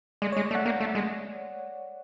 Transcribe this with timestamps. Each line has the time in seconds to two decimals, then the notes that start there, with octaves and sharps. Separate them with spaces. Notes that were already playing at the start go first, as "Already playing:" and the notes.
0.22 G#3 D5
0.32 C#5
0.37 G#3
0.44 D5
0.51 A3
0.55 F#5
0.66 A#3 F#5
0.80 A3
0.95 G#3